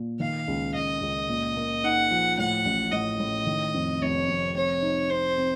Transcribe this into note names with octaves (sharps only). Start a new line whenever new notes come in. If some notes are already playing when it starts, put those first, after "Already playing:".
Already playing: A#2
D#3 F5
C#2
C#2 D#5
C#2
A#2
A#3
D#4 F#5
F3
A2 F#5
A1
A2 D#5
A2
D#3
F2
F1 C#5
F1
C4 C#5
D#4
C4 C5
C4